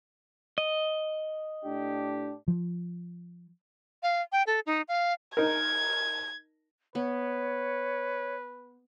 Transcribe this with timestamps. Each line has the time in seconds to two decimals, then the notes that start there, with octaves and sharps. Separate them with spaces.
0.58 D#5
1.65 A2 D4 G4
2.48 F3
4.03 F5
4.32 G5
4.47 A4
4.66 D#4
4.88 F5
5.37 D#4 A#4 G#6
6.95 B3 B4 C#5